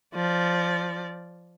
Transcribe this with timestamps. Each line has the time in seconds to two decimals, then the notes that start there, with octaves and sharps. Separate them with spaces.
0.15 F3 D5